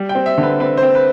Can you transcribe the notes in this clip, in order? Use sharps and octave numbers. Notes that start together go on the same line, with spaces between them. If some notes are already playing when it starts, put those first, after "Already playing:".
Already playing: G3
G5
C4
E5
D3
B4
C4 B4
C5
C4
B4